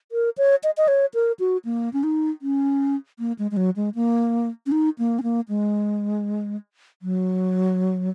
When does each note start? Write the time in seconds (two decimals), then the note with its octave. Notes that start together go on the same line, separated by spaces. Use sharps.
0.12 A#4
0.38 C#5
0.63 D#5
0.77 D#5
0.88 C#5
1.14 A#4
1.39 F#4
1.65 A#3
1.93 C#4
2.03 D#4
2.42 C#4
3.19 A#3
3.39 G#3
3.51 G#3
3.57 F#3
3.76 G#3
3.95 A#3
4.66 C#4
4.72 D#4
4.99 A#3
5.19 C#4
5.23 A#3
5.49 G#3
7.02 F#3